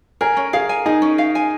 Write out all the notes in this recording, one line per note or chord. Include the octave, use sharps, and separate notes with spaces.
G#4 A#4
C#4
G#4 F5
G#5
D#4 G#4
C#4
F5
G#5